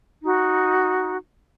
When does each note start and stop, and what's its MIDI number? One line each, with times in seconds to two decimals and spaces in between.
0.22 1.16 63
0.22 1.16 66